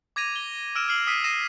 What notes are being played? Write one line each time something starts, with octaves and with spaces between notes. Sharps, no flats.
D6 G#6 A#6 D#7 F7
G7
E6 F6 D7 E7
E6 F6 C7 F#7
D#6 E6 B6 C7 D#7
D#6 A#6 C7 D#7 E7